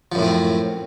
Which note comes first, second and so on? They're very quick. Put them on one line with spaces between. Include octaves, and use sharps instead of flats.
F3 F#2 A2 C4